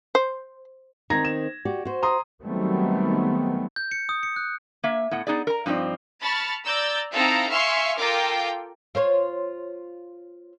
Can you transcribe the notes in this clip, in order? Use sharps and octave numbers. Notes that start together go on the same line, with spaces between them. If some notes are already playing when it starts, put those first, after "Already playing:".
C5
D#3 C4 A#5 G#6 A#6
E7
F#4 G4 D5
F#4 C5
A#5 C6 D#6
D#3 F#3 G3 A3 B3 C4
G6
C#7
D#6
C#7
F#6
A#3 E5
A2 B3 F#5
B3 D#4 G#4 D5
A#4 A#5
G2 F3 C4 D#4 D5
A5 B5 C#6 F6 A6
D5 A#5 E6 G6 A6
C4 D#4 E4 A4 F5 A#5
E5 F5 G#5 C6 C#6 F6
F4 A4 A#4 G5 D6
F4 C5 C#5